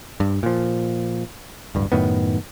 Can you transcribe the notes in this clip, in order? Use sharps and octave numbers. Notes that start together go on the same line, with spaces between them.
G2
A#2 F3
D1 G2
F#2 A2 D#3 B3